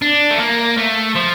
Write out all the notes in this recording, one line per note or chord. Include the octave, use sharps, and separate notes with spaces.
D4
A3
A#3
A3
F3